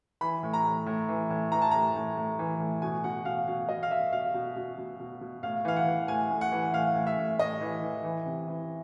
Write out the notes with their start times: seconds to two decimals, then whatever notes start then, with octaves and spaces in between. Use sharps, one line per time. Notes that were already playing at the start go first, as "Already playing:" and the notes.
0.21 E3 B5
0.43 A2
0.53 A#5
0.65 A2
0.86 A2
1.08 E3
1.30 A2
1.52 E3 A#5
1.62 A5
1.71 A2 A#5
1.95 A2
2.17 A2
2.39 E3
2.60 A2
2.82 B2 G#5
3.04 B2 F#5
3.25 B2 F5
3.48 B2 F5
3.69 B2 D#5
3.83 F5
3.91 B2 E5
4.13 B2 F5
4.34 B2
4.56 B2
4.78 B2
5.00 B2
5.21 B2
5.43 A2 F5
5.65 E3 F5
5.76 F#5
5.87 E3
6.08 A2 G#5
6.30 A2
6.41 F#5
6.52 E3
6.73 A2 F5
6.95 A2
7.07 E5
7.18 A2
7.39 A2 D#5
7.61 E3
7.83 E3
8.04 E3
8.26 C3
8.47 E3